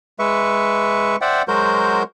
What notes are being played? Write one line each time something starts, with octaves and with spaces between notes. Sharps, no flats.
G#3 B4 E5 C#6
C5 D5 E5 F#5 G5
F#3 G#3 F#4 A#4 C5 G6